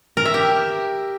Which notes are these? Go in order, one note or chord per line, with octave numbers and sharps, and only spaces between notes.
A#4
E5
G4